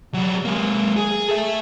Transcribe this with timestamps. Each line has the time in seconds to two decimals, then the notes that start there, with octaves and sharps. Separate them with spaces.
0.14 F#3 G3
0.45 G#3 A#3
0.97 G#4
1.29 A4 E5